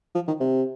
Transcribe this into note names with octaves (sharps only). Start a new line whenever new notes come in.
F3
D#3
C3